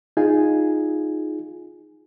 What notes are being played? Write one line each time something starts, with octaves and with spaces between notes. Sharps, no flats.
D#4 F4 G#4 G#5